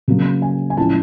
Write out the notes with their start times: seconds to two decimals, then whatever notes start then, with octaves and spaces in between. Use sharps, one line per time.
0.08 C#3 F#3 A#3
0.42 G#5
0.70 G#5
0.77 A2 F3 G#3 C#4 E4 A5